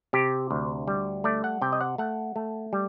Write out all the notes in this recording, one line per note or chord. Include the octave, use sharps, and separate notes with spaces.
C3 G4
D2
G3
A3 D5
F#5
C3 G5
D#5
F#5
A3 F#5
A3
G3